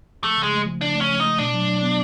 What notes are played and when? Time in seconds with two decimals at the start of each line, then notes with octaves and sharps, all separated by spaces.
0.24 F3 A3
0.37 C#3
0.43 G#3
0.52 A3
0.67 F3
0.81 C#3 D4
0.95 A3
1.01 C#4
1.10 F3
1.20 A3 D#4
1.39 B2 D4
1.54 F#3
1.68 F#3
1.82 B3